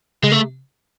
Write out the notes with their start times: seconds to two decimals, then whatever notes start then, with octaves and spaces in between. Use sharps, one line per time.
0.23 C#3 G#3
0.31 A3